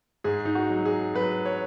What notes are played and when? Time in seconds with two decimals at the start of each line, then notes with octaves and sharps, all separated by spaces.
0.24 G#2 G#4
0.45 D#4
0.55 F#4
0.70 F#3
0.85 G#4
1.14 F#3 B4
1.45 C#5